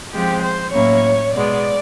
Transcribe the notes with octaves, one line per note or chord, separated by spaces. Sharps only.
F3 G#3 C4 G4
C5
A2 F#3 A#3 C#4 E4 C#5
B2 G#3 B3 D5